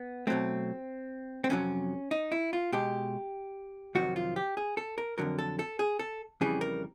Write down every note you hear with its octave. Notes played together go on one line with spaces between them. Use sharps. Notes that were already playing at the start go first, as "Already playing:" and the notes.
Already playing: B3
B2 F#3 A3 C4
C4
F2 C3 D#3 F#3 C#4
D#4
E4
F4
B2 G#3 G4
F2 C3 D#3 F#3 F#4
F4
G4
G#4
A4
A#4
F2 D3 F#3 A#4
A4
A4
G#4
A4
F2 C#3 E3 G3 G#4
A#4